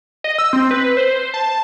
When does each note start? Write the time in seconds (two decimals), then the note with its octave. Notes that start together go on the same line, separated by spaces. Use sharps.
0.24 D#5
0.38 E6
0.53 C4
0.71 B4
0.97 C5
1.34 A5